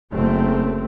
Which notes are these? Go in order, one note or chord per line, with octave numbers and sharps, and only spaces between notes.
F#1 A3 C4